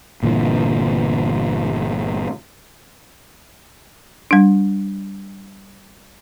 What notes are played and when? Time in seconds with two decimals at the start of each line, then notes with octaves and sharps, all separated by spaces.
0.23 G1 A#2 D3 E3
4.31 G3 D4